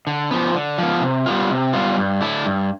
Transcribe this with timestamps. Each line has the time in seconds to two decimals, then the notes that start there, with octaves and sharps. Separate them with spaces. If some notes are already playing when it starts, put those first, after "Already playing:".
0.07 D3
0.31 F3 B3
0.54 D3
0.78 F3 B3
1.02 C3
1.26 G3 B3 F4
1.50 C3
1.73 G3 B3 F4
1.98 G2
2.21 D3 A3 E4
2.45 G2